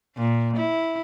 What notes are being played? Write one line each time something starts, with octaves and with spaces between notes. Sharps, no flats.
A#2
E4